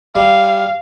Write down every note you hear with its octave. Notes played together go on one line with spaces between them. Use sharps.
G3 F5